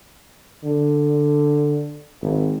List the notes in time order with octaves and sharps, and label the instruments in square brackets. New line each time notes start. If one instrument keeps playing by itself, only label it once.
[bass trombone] D3
G#1